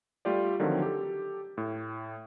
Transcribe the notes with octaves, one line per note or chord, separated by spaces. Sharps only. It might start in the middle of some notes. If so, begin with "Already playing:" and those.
G3 A3 F4 G4 D5
D3 D#3 F3 F#3 A3 C4
G4 A4
A2